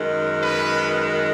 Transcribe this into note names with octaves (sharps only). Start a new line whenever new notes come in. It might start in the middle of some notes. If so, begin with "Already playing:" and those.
Already playing: F#2 D#3 G#3
B4